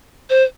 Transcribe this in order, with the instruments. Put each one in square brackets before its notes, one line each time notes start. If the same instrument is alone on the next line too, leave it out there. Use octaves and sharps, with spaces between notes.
[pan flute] C5